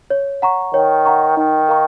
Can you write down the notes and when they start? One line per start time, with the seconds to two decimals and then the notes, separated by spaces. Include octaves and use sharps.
0.10 C#5
0.42 F#5 A#5 C#6
0.74 D#3 C#5
1.05 F#5 A#5 C#6
1.37 D#3 D#4
1.69 A#4 F5 A#5 C#6